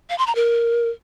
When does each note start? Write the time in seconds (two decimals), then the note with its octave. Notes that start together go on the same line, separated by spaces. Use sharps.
0.10 F5
0.18 C6
0.27 A#5
0.35 A#4